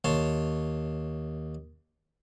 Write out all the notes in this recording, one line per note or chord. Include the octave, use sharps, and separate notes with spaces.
D#2 C#5 A5 C6